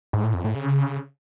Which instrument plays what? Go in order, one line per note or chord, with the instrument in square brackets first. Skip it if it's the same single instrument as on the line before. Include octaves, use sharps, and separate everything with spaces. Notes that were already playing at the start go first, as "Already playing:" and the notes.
[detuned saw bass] G#2
A2
F2
A2
C#3